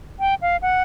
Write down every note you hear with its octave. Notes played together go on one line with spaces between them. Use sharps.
G5
F5
F#5